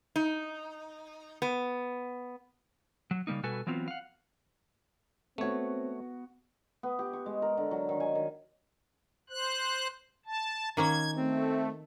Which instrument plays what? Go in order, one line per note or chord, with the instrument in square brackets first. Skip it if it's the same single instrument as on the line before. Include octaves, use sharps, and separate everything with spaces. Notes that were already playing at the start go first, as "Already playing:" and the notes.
[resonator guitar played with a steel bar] D#4
B3
[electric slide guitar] F#3
C#3 G3 A#3 D#4
B2 G3 F#4 A4 B4 G#5
E3 F#3 B3 C4 F4
F5 F#5
[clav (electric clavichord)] A3 C#5 [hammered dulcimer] B3 F#4 [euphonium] C4
[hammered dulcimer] B3
G4
C#6
G#3
A#4
D3
F#3
D#3
G#5
D#3
[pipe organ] C5 F#6
A5
[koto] D#3 A#3 C#4 [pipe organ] G#6
[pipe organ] A3 [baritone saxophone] C4